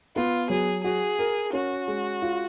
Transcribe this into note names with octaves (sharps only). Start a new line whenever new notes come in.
B3 F4
F#3 G#4
F#4 G#4
A#4
C#4 F#4
G#3
F4